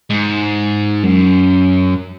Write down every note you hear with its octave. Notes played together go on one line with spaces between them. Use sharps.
G#2
F#2